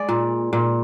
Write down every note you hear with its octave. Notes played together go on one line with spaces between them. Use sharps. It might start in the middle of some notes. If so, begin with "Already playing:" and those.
Already playing: G#3 D5
A#2
A#2